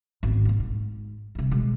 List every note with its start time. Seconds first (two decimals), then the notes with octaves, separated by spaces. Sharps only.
0.23 G#1 B3
0.45 B1 A#2
0.60 G#2
1.35 C3 G3
1.51 B2 G#3